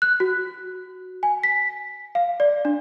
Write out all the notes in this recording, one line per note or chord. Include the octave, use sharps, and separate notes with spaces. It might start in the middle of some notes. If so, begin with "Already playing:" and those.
F#6
F#4
G#5
B6
F5
D5
D4